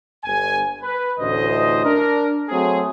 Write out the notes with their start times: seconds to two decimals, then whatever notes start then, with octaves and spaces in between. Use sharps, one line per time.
0.24 G1 G#5
0.82 B4
1.19 A1 D2 A2 C5 D#5
1.85 D4 A#4
2.49 F#3 A3 C4 G#4